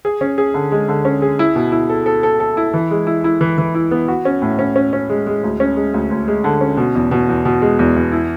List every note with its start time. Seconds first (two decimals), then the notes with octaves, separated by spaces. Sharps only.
0.05 G#4
0.21 C#4
0.38 G#4
0.54 D3
0.72 G#3
0.88 D3
1.05 C#4
1.22 G#4
1.39 E4
1.56 B2
1.72 E4
1.89 A4
2.06 A4
2.23 A4
2.40 A4
2.57 E4
2.74 E3
2.91 G#3
3.07 E4
3.24 E4
3.41 E3
3.58 E3
3.75 E4
3.91 B3
4.08 F#4
4.25 C#4
4.42 A2
4.59 C#4
4.76 C#4
4.93 C#4
5.10 G#3
5.27 G#3
5.43 D2
5.60 C#4
5.76 G#3
5.94 D2
6.11 D2
6.28 G#3
6.44 D3
6.61 C#4
6.77 B2
6.95 E2
7.11 B2
7.29 E2
7.45 B2
7.62 G#3
7.79 E2
7.96 E2
8.12 E4